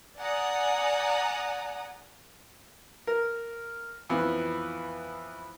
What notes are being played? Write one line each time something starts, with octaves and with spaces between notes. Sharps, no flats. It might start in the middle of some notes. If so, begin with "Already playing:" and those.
D5 F#5 G#5 A#5 D#6
A#4
F2 E3 B3